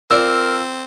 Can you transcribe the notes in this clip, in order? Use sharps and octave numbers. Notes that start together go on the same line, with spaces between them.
C4 F4 A#4 D5 E6